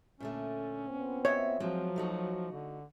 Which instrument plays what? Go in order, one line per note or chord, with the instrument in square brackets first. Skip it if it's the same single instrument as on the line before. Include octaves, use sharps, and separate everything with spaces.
[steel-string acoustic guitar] A#2 D3 A3 [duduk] C#4
[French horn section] A#2 B3 C4
[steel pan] C#5 [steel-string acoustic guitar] D#5 E5
[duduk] F3 [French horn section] F#3 [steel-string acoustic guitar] G#3 C4 F4
[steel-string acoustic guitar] A3 D#4 F#4
[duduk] D3